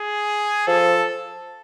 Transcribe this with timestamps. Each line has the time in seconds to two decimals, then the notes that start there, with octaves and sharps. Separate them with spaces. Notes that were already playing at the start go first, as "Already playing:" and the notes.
Already playing: G#4
0.67 F3 A4